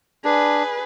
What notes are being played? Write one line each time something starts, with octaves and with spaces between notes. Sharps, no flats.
D4 G#4 B4